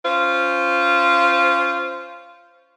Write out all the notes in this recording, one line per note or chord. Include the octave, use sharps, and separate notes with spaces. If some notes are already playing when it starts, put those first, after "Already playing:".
C#4 F4 C5